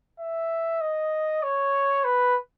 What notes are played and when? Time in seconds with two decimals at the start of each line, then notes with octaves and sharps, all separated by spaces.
0.20 E5
0.81 D#5
1.43 C#5
2.04 B4